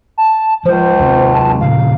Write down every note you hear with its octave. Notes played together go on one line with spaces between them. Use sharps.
A5
C#2 F3 C5
D#2 C3 G#3
A5
A#2 C#3 F3 F5